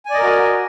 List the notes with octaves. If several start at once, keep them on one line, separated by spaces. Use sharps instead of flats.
F#4 A#4 D5 D#5 G#5